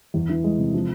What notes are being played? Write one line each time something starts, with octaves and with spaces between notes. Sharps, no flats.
E2
E3
G#3
C3
F3